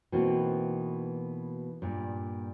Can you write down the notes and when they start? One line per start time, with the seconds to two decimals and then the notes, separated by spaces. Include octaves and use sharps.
0.12 B2 E3 A#3 C4 D#4 F#4
1.82 G2 A#2